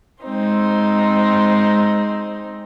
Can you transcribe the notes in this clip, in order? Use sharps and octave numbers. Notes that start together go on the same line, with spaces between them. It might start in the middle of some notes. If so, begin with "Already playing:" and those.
G#3 C4 D#4 C5